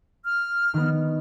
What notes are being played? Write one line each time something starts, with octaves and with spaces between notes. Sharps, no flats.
F6
D#3 B3